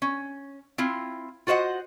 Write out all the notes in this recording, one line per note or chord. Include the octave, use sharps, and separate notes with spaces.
C#4
C4 E4 F4
F4 F#4 C5 D#5 F#5